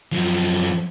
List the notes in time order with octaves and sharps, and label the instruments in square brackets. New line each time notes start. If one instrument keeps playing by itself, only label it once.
[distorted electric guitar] F#2 F3